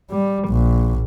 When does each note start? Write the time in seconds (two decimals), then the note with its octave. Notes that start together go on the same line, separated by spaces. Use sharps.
0.11 G3
0.49 A#1